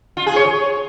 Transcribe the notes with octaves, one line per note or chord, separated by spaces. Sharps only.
F4
G#4
C#5